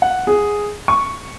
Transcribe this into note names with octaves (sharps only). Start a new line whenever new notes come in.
F#5
G#4
C#6